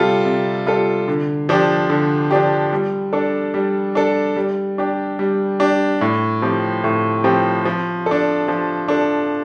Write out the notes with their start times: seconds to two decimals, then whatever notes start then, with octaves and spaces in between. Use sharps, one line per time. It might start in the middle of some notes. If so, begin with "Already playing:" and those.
Already playing: C3 G3 F4 A4
0.25 C3
0.67 G3 F4 A4
1.08 D3
1.49 F3 D4 G4
1.90 D3
2.31 F3 D4 G4
2.73 G3
3.13 D4 A4
3.54 G3
3.95 D4 A4
4.36 G3
4.78 D4 G4
5.19 G3
5.60 D4 G4
6.01 A2
6.42 F3 C4 G4
6.84 A2
7.24 F3 C4 G4
7.65 F3
8.06 D4 A4
8.48 F3
8.88 D4 A4